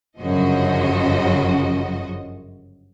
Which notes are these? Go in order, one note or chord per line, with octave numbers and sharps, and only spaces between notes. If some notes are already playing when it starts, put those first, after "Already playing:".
G1 F#2 C#3 F3 F#4 D#5